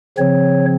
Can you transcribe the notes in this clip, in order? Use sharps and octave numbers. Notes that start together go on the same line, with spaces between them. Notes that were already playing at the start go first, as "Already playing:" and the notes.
C#3 F3 C4 C#5